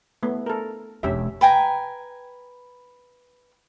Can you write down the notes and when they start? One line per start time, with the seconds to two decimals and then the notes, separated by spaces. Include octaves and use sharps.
0.23 A3 B3
0.46 A4 A#4
1.03 E1 C#4 D4 G4 E5
1.41 B4 G5 G#5 A#5